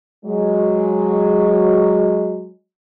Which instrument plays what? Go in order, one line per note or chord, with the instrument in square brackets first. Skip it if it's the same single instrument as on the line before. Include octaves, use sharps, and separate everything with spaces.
[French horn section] F#3 G#3